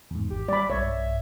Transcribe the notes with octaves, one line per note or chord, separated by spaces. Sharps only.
E2 G#2
G#1 G4
G3 D5 B5
B1 G2 C#5 E5